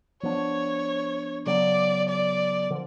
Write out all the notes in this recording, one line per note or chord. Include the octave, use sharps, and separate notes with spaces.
F3 B3 D4 C#5
C#3 F#3 B3 D5
D5
D3 F3